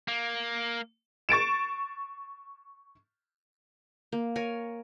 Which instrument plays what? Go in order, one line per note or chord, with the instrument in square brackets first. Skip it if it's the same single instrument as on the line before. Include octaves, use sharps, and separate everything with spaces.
[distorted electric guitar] A#3
[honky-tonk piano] C#6 A6 D7 E7
[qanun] A#3
A#4 C#5 G#5